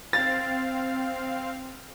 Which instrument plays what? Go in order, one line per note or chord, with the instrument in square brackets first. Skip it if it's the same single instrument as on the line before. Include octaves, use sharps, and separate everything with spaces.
[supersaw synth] C4 F5 [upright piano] A6